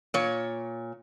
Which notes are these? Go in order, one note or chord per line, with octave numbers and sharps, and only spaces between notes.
A#2 C#5